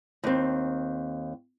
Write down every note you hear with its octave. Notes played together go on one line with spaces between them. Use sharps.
D#2 C4